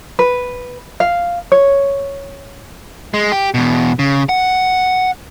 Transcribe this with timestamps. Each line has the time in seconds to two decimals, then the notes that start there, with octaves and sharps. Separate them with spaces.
0.19 B4
1.00 F5
1.52 C#5
3.14 G#3
3.32 G4
3.54 E2 B2
3.99 C#3
4.29 F#5